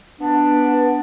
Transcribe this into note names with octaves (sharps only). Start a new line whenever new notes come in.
B3 D4